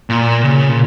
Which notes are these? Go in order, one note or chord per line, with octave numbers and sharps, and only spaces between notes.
A#2
C#3
A#2